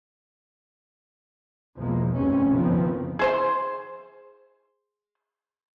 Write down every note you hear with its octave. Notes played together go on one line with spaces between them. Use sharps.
B1 E2 B2 F3 G#3 A#3
F1 B1 G2 C3 C4 C#4
F#1 D#3 F3 B3 C4
G#4 C5 C6